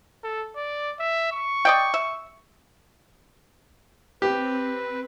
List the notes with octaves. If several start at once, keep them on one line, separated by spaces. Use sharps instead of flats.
A4
D5
E5
C#6
D5 D#5 G5
E5
C4 G4 B4